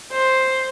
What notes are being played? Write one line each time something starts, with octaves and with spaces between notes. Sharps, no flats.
C5